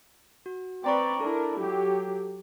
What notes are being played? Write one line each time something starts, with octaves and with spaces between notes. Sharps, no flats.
F#4
C4 B4 D5 G5 A#5 C#6
D4 E4 A4 A#4
F#3 G4